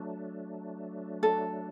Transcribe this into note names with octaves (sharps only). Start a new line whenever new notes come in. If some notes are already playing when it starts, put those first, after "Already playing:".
Already playing: F#3 A3 D4
A4